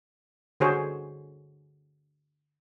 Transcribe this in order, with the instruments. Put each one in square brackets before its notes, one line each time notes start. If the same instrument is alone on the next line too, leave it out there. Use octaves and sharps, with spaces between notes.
[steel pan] D3 F#4 G#4 C5 C#5